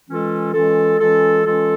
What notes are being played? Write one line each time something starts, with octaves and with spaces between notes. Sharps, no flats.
E3 G#3 C#4 F4 A4
E3 G#3 C#4 F4 A4
E3 G#3 C#4 F4 A4
E3 G#3 C#4 F4 A4